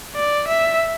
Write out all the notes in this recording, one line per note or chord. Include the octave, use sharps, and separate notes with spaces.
D5
E5